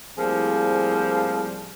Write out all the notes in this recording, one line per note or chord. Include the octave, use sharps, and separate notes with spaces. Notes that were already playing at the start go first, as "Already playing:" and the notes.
A2 F3 G3 A#3 C4 G#4